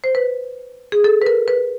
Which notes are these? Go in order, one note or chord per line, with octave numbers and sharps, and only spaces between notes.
C5
B4
G#4
A4
B4
A#4
B4